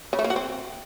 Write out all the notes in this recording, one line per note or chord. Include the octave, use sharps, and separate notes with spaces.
C#3
A3
A#3
F#4
C4